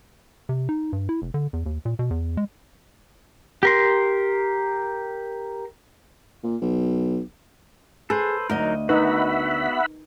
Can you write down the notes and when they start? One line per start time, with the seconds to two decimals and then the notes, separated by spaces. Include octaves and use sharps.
0.49 C3
0.69 D#4
0.93 G2
1.09 E4
1.22 F1
1.34 D3
1.53 E2
1.66 D#2
1.85 A#2
1.99 B2
2.10 E2
2.37 G#3
3.63 G4 A#4 C6
6.43 A#2
6.61 B1
8.10 G#4 A4 B4 C5
8.50 D2 F#3 D#4 A#4 D#5
8.89 B3 D#4 F#4 B4 E5 F#5 B5